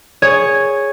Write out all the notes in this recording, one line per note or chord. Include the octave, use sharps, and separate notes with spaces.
G#4 C#5